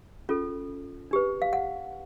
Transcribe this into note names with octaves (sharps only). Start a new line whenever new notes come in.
C#4 F4 A4
D4 G4 B4
F5
F#5